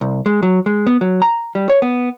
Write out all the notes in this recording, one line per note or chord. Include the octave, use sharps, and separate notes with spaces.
C2
G#3
F#3
G#3
B3
F#3
A#5
G3
C#5
B3